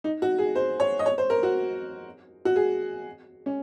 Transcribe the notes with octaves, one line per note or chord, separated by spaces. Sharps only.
D#4
F#4
G#4
C5
C#5
D#5
C#5
C5
A#4
F#4
F#4
G#4
C#4